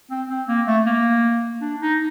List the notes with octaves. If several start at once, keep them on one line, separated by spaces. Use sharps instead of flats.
C4
C4
A#3
A3
A#3
D4
D#4